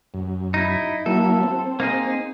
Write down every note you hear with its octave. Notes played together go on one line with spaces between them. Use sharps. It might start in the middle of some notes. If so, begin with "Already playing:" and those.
F#2
D#4 E4
F#3 A#3 E4 A4
C4
A#3 D#4 G#4